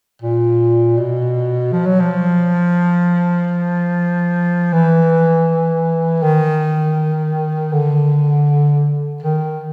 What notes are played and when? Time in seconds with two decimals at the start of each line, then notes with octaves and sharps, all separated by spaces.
0.22 A#2
0.98 B2
1.72 F3
1.86 F#3
2.00 F3
4.73 E3
6.22 D#3
7.73 D3
9.22 D#3